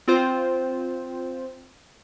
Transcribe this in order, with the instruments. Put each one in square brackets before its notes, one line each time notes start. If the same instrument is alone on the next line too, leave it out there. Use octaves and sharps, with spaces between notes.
[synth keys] C4 F4 C5